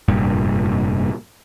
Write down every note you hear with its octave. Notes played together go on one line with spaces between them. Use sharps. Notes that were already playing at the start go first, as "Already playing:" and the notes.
F1 G2 A#2